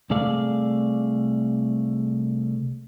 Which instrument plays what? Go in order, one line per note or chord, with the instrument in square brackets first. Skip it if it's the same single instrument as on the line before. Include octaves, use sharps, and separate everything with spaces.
[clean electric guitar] C2 C3 A3 G#4 D5 F5